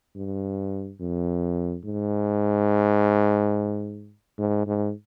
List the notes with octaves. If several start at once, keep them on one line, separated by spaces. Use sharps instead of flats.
G2
F2
G#2
G#2
G#2